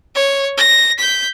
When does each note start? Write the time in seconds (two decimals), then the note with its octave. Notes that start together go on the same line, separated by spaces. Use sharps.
0.15 C#5
0.58 A#6
0.99 G6 B6